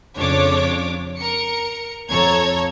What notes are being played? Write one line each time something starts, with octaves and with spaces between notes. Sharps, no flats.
F2 C#3 D4 C#5 D6
A#4 C#7
F2 A4 C#5 A#5 C#6 G#6